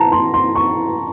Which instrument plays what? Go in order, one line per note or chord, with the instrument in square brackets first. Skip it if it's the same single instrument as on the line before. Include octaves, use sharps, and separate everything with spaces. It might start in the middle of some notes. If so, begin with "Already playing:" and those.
Already playing: [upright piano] A5 A#5
C6
C6
C#6